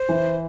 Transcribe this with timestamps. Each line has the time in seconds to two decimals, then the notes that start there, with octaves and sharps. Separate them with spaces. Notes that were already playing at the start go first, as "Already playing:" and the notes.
Already playing: C5
0.09 E3